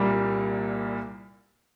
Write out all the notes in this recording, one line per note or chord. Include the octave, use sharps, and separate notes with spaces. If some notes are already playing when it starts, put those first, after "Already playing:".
Already playing: C2 A#2 G3 A#3